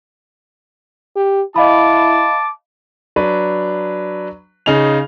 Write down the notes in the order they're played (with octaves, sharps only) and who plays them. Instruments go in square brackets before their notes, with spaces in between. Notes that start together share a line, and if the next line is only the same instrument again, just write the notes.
[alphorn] G4
[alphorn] E4 [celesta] D#5 F5 B5 [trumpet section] A5 D6
[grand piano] F#3 D4 B4
C#3 D#4 G#4 F7